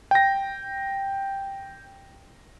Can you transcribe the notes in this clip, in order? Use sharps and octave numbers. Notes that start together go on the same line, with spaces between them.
G5 A#6